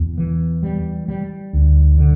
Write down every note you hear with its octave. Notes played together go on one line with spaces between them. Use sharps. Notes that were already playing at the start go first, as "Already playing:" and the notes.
Already playing: E2
E3
G3
G3
D2
D3